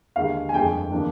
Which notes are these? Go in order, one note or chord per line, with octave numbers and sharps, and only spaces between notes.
D#2 D3 G#3 F5
G#5
G1 F2 D3 F3 G#3 G5
D3 F3 A#3 D4